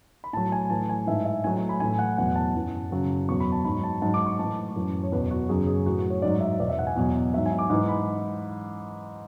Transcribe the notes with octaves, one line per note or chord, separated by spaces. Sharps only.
B5
A2 F#3 A5
G#5
A2 E3 A5
G#5
G#2 E3 E5
E5
A2 F#3 G#5
G#5
B5
A2 E3 G#5
F#5
E2 B2 F#3 F#5
A5
F#2 E3
F#2 C#3 F#3
E2 B2 F#3 C#6
B5
A5
G#2 F#3 B5
A5
G#2 F#3 A5
D6
C#6
A2 E3 A5
F#2 E3
C#5
E2 B2 F#3 B4
F#4
F#2 C#3 F#3 G#4
G#4
A2 E3 F#4
F#4
C#5
G#2 F#3 D5
E5
E2 B2 F#3 D5
E5
F#5
G#5
E2 B2 F#3
G#2 F#3 E5
G#5
D6
G#2 E3 D6
B5